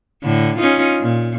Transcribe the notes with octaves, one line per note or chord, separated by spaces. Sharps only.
A2 D3
C#4 D#4 F4
A#2